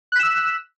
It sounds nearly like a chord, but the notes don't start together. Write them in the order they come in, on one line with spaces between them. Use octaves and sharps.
F#6 B6 E7 E6